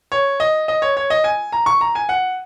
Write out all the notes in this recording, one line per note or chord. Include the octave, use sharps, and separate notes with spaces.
C#5
D#5
D#5
C#5
C#5
D#5
G#5
A#5
C#6
A#5
G#5
F#5